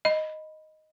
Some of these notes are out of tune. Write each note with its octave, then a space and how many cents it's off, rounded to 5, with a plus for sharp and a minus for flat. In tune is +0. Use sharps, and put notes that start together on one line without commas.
D#5 +0 B5 +0